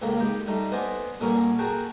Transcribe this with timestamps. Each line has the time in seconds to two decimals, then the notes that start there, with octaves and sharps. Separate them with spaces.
0.02 C#2 A2 C#3 A#3
0.18 G#3 D#4 G4 G5 B5
0.47 G3 A3 D#4
0.71 B3 C5 D5 D#5 G#5
1.20 A#2 D3 G3 C#4 A#4 C#6
1.59 F#4 G#4 A#4 G5 A5